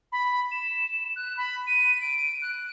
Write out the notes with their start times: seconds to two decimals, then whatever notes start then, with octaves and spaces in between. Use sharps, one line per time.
0.12 B5
0.51 E7
1.16 F#6
1.37 B5
1.67 D#7
2.01 D7
2.42 F#6